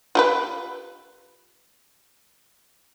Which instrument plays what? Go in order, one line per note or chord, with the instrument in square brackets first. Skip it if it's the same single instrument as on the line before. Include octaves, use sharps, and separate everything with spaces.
[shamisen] F4 G4 B4